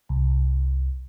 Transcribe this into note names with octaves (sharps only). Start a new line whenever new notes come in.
C2